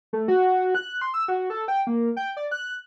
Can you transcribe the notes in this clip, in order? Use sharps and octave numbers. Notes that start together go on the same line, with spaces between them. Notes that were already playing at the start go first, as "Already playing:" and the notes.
A3
F#4
F#6
C6
E6
F#4
A4
G5
A#3
G5
D5
F#6